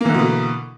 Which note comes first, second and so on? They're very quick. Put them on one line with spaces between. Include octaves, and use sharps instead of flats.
A#3 E3 D3 B2 B3